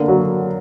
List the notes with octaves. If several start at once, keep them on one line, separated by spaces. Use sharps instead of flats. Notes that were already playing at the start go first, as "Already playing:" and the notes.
Already playing: D3 A#3 B3
F#3